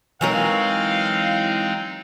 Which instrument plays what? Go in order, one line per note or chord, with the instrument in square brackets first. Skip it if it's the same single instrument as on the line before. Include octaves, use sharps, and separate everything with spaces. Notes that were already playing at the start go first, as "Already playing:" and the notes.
[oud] E3 F#3 A#4 [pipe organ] G#3 C4 D#4 [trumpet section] F5